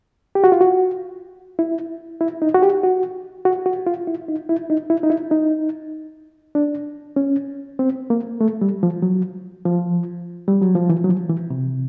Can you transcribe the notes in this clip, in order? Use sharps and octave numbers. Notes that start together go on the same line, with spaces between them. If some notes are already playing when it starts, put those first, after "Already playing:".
G4
F#4
F4
F#4
E4
E4
D#4
F#4
G4
F#4
F#4
F#4
F4
E4
D#4
E4
D#4
E4
D#4
E4
D#4
D4
C#4
C4
A#3
A3
G3
F3
F#3
F3
G3
F#3
F3
E3
F#3
F3
E3
C3